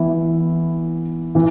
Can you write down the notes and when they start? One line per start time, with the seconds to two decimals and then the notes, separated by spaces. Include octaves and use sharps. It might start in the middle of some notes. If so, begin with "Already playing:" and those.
Already playing: E3 B3 E4
1.35 E3